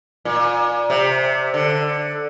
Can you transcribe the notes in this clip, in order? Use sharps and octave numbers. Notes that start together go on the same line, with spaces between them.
A#2
C3
D3